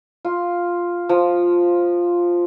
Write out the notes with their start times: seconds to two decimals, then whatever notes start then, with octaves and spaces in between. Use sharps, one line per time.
0.25 F4
1.09 F3